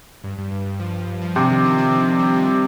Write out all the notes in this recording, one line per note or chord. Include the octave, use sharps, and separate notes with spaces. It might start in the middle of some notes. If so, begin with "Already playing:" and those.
G2
G2
G2
G2
F3
G2
G2
F3
C3 D4
D#3
D4
D4
D#3
D#3
G3
G3
G3